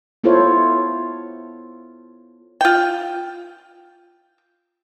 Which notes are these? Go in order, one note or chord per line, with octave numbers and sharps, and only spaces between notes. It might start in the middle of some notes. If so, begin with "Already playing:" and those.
B3 E4 F4 A4 C5 C#5
F4 G5